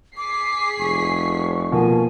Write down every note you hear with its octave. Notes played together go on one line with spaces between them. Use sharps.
G#4 D6 B6 C7
F1 C#6
B2 F3 A#3 G#5